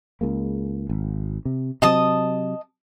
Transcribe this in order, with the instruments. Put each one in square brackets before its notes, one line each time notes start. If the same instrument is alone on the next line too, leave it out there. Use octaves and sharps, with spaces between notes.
[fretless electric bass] C#2 G#3 A#3
G#1
C3
[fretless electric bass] C3 F#3 C4 [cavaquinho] D#5 A5 D#6